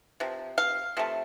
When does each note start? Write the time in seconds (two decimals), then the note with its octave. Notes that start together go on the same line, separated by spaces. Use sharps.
0.20 C3 F3
0.58 F5
0.97 C3 F3 A3